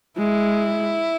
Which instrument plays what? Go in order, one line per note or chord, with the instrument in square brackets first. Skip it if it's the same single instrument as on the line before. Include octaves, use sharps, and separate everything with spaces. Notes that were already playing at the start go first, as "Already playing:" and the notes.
[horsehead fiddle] G#3 [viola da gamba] E4